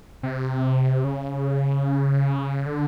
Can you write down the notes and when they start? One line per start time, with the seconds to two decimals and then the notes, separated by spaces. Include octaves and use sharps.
0.23 C3
1.04 C#3
2.66 D3